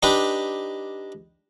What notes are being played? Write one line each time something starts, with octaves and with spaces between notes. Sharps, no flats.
D4 D#4 G4 B4